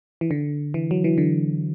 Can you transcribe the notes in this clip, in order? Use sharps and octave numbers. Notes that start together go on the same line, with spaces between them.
E3
D3
E3
F#3
E3
D3